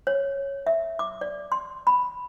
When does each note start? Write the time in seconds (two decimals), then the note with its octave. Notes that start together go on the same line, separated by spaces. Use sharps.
0.07 C#5
0.67 E5
0.99 D6
1.21 D5
1.52 C6
1.87 B5